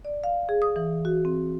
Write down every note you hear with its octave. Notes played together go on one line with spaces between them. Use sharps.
D5
F5
G#4
D#6
E3
F#4
C4